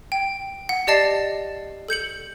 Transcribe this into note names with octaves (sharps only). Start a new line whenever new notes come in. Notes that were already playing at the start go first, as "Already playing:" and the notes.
G5
F#5
G4 D5 D#5 A5 A6 C7
A4 G6 C#7 F#7